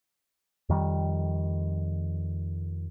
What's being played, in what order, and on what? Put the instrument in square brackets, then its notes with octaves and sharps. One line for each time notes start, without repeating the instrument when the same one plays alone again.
[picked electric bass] F2 D#3 G3